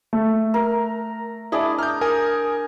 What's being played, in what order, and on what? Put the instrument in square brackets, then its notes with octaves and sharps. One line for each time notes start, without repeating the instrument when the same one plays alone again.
[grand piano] A3
[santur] A#4
[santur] D4 G#4 D#5 [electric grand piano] E4 D5
[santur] A#5 [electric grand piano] F6 G6
[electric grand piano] A#4 G#5 D#6